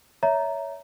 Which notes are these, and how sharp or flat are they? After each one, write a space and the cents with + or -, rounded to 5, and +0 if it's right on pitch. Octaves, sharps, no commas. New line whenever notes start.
C#5 +20 E5 -5 A#5 +0